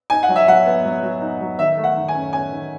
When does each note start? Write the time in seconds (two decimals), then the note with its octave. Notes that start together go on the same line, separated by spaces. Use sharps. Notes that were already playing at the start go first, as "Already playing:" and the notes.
0.10 D#4 G#5
0.23 F#5
0.29 F#3
0.36 E5
0.48 F#3 F#5
0.66 B3
0.85 F#3
1.03 F#3
1.21 D#4
1.41 F#3
1.59 D#3 E5
1.77 A3
1.84 F#5
1.96 D#3
2.08 G#5
2.15 C#4
2.33 C#4 G#5
2.53 D#3